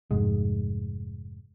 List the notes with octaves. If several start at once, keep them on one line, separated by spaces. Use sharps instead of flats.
F1 G#2 G#3